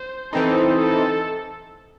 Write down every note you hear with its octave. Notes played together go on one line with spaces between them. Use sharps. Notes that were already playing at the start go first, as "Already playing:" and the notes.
Already playing: C5
E3 C4 D#4 A4
A4